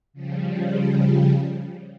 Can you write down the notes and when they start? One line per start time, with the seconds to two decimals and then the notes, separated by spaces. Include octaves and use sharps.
0.13 C#3 F3 G3